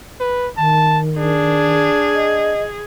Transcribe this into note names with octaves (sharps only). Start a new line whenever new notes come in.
B4
D#3 A5
D4 G#4
D#5